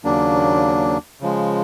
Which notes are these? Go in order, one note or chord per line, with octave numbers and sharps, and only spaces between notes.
D#2 C#3 F#3 A#3 D4
C#3 F3 G#3